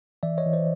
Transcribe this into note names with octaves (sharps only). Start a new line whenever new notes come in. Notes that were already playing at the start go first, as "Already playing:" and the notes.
E3 D5 E5
C#5 D#5
E3
C5 D5